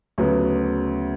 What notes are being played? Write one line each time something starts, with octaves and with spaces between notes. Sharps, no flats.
D2 C#3 F#3 B3